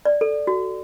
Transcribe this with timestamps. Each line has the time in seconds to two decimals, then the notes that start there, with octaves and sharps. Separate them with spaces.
0.05 D5
0.21 A4
0.47 F#4